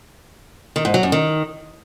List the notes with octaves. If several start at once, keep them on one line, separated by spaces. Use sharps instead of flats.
D#3
G#2
F#3
F#2
D#3